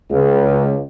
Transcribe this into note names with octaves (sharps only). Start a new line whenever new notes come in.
C#2